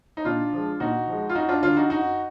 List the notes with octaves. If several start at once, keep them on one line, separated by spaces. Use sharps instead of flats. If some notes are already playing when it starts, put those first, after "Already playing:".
D#4
A#2 D4 F4
F3 G#3
A#2 D#4 F#4
F3 G#3
F4
F#2 D#4 F#4
D4 F4
D3 F#3 D4 F4
D#4 F#4
F#2 D#4 F#4